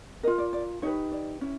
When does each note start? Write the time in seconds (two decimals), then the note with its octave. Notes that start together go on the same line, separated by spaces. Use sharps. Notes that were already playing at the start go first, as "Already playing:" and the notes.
0.23 A#4 D#5
0.27 F4
0.38 D5
0.53 D5
0.82 D#4 G4 B4 C#5
1.12 D5
1.41 C#4 E4